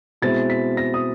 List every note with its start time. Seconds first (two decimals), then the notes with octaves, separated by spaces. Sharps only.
0.22 B2 G#3 C4 E4 A6
0.50 B6
0.77 A#6
0.94 D#6